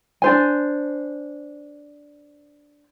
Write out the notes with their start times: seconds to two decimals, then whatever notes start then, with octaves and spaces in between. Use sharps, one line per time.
0.22 D4 C5 G#5